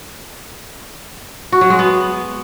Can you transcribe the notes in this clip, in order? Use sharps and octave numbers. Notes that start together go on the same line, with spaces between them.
F#4
F#3
G#3
B3